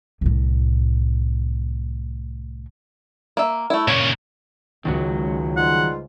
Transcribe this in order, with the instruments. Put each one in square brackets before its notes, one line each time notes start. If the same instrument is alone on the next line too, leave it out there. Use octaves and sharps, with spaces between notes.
[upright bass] C2 A2
[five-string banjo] A#3 E5
A3 E4
[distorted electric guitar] A#2 C#3 [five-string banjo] C#5
[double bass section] C#2 [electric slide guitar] D#3 F#3 F#4
[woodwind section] G#2 G3 F4 [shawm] F#5